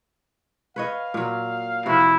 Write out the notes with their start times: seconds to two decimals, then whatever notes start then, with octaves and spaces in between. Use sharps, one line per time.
0.76 B4 C#5 D#5 F5
1.14 A#2 F#3
1.86 C3 F3 E4 F#4